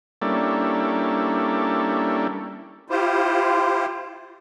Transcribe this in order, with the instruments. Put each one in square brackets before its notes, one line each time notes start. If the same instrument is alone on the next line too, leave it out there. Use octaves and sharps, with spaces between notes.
[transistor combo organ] G3 A#3 C#4 D4 E4 A4
[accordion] E4 F4 G4 C5